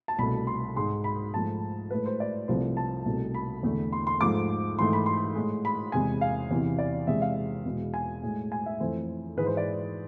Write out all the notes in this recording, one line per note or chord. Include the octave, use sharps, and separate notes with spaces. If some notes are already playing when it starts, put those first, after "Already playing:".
A5
C2 B2 A3 B5
C6
G#2 G#3 C6
B5
G#2 F3 A3 A5
A2 G#3 B4
C5
D5
C2 C3 F3 A3 C5
A5
C2 B2 A3
B5
E2 D3 A3
C6
C6
G#2 F3 A3 D6
G#2 E3 A3 C6
B5
C6
A2 G#3
B5
E2 C3 G#3 G#5
F5
E2 C3 E3
D5
E2 C3 G#3 E5
F5
E2 B2 G#3
G#5
A2 G#3
G#5
E5
F2 E3 A3 C5
G#2 E3 G#3 B4
C5
D5